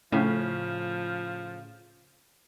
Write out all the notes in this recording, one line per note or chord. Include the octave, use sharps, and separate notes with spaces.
A2 C#3 F3